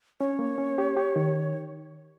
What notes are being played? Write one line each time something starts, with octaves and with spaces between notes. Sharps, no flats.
C#4 C#5
A#3
C#4
G4
G4
D#3